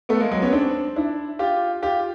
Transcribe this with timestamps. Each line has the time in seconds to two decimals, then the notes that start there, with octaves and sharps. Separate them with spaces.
0.09 A3 B3
0.20 G#3 A#3
0.31 F#3 G#3
0.42 B3 C#4
0.53 C4 D4
0.96 D4 E4
1.39 F4 G4
1.82 F4 G4